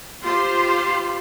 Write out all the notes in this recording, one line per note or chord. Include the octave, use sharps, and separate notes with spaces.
F4 G4 C5 C6